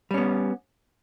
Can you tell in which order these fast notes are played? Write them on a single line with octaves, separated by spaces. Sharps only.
G3 C#4 B3